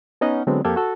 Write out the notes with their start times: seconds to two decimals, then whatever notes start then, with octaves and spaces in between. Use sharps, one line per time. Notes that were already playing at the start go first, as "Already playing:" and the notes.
0.21 B3 C#4 D#4 D#5 F#5
0.47 D3 F#3 G#3 B3 C4
0.65 F2 A#3 G4 A4 G#6
0.76 F#4 A4